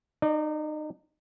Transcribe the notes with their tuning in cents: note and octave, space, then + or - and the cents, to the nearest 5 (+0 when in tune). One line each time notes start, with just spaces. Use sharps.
D#4 -30 D5 +5